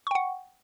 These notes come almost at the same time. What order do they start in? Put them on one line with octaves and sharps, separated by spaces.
C#6 G5 F#5